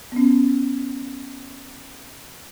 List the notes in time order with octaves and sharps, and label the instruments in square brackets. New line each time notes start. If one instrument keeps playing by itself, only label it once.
[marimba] B3 C#4